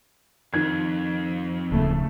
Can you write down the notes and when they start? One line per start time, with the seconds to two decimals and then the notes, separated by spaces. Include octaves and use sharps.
0.54 F2 D#3 G#6
1.72 D1 C#3 A3 A#3